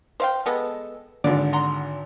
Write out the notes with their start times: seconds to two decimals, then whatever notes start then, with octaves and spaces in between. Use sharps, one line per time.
0.20 C5 F5 G5
0.46 G#3 B3 A4
1.24 G#1 D3 D5
1.53 F#5 A#5 C6